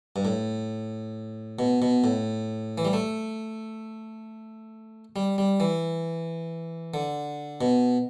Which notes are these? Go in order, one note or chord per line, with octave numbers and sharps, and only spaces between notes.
G2
A2
B2
B2
A2
E3
G3
A3
G3
G3
E3
D3
B2